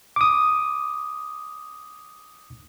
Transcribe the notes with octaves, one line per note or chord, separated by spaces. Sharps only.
D6 D#6